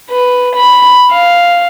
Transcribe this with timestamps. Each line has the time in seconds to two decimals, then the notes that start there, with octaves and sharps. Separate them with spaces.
0.10 B4
0.56 B5
1.11 F5